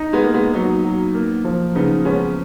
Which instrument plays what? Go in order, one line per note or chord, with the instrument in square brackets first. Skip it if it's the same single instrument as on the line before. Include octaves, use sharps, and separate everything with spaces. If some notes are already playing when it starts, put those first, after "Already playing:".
Already playing: [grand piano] D#4
[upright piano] G#3 B3
[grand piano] A#3
[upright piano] G#3 B3
[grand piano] F#3 [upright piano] B3 D#4
[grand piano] F#3
A#3
F3
[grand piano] C#3 [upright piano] B3 D#4
[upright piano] G#3 B3 [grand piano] C#4